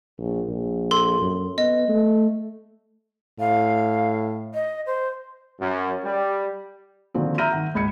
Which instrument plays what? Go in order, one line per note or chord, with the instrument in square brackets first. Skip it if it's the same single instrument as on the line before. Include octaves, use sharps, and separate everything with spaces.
[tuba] A#1
A#1
[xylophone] A4 C6 G7
[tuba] F#2
[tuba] B3 [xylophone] D#5
[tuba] A3
[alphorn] A2 [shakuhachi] F5
[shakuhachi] D#5
C5
[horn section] F#2
G3
[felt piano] A#2 D3 D#3 F3 F#3 C4
E5 A#5 F6 G6 A#6 D#7
D#3 F#5
G#1 C#2 B5 G#6 C#7